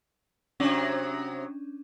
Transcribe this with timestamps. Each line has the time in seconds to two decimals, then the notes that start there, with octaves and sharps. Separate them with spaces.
0.60 C3 F#3 C#4 D4